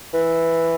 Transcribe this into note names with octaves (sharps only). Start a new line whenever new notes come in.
E3